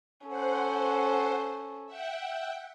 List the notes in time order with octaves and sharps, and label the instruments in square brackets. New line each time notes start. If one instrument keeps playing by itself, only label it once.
[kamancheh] C#4 A4 [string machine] C5 F#5
[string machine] E5 F#5 G5